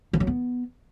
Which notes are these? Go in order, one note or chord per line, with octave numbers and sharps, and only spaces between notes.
F3
F#3
B3